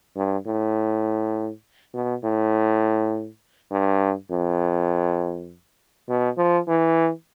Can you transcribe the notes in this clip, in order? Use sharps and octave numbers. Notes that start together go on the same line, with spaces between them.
G2
A2
B2
A2
G2
F2
B2
F3
E3